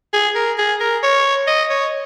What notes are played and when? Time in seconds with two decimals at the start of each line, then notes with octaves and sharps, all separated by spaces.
0.13 G#4
0.35 A#4
0.58 G#4
0.80 A#4
1.03 C#5
1.47 D#5
1.70 C#5